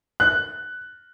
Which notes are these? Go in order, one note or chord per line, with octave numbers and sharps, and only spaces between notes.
F#6